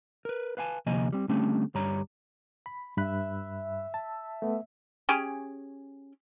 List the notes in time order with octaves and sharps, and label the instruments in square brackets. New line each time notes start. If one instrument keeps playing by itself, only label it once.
[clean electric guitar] A#4 B4
B4 F5 F#5 G#5 A5
D2 C3 F3 A#3 D#5 G#5
G3 C4
D3 G3 A3 C4 C#4
D2 G2 G3 C#5 A#5
[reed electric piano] B5
[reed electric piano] G2 B5 F#6 [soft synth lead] E5
[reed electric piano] A5
A3 B3
[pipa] C#4 G4 G#4